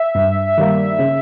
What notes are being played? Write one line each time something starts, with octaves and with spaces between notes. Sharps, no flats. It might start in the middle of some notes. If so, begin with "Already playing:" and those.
Already playing: E5
G2
D#3 G3 A#3
C#3